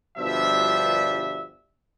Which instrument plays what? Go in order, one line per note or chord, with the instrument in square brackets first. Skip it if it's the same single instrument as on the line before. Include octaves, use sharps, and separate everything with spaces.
[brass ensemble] G1 B2 F3 G3 D4 E5